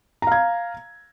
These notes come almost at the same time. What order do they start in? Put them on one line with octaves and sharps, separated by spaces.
A#5 F5 G#6